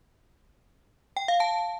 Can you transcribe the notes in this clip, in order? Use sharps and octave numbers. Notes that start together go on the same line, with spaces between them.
G5
F5
A5